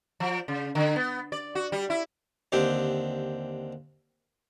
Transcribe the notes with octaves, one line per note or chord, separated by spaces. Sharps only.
F3
C#3
D3
B3
D5
F#4
G3
E4
D#2 D3 C4 G4